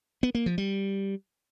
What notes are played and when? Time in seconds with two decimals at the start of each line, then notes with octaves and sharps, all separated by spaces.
0.23 B3
0.35 A#3
0.46 F3
0.58 G3